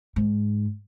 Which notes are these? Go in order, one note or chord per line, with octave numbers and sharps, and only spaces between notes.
G#2